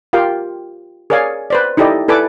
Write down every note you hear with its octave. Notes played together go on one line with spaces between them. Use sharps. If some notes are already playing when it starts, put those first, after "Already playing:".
F4 G4 A#4 F5 G5
G#4 A#4 C#5 D5 F5 G#5
B4 C5 D5
D#4 E4 G4 A4 D5 D#5
E4 A4 B4 D5 G#5 D6